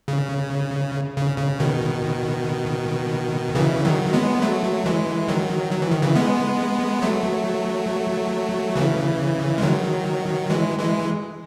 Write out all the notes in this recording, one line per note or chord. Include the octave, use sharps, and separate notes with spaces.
C#3
C#3
C#3
B2 D#3
C#3 E3
D#3 F#3
G#3 B3
F#3 A3
E3 G#3
D#3 F#3
F#3
E3
D#3
C#3 E3
G#3 B3
F#3 A3
C#3 E3
G#3
D#3 F#3
E3 G#3
E3 G#3